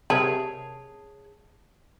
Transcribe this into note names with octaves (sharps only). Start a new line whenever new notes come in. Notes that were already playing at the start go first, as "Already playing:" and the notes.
C3 G#4 A#4 C#5 E5 G5 A5